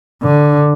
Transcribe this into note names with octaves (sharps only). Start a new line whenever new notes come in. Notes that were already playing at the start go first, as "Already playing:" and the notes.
D3